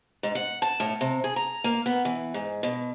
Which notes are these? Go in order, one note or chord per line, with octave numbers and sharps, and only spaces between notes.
G#2
F#5
A5
A2
C3
G#4
A#5
A#3
B3
E3
G#2
B2